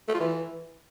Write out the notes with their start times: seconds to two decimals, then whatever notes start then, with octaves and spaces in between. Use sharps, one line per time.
0.08 A3
0.14 F4
0.20 E3